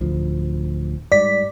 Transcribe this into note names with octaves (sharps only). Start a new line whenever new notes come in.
D1 D2 F3
G#2 G3 D5 B6